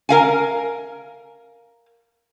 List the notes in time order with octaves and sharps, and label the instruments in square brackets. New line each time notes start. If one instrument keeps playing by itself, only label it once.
[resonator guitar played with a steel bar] A#4 F5 G#5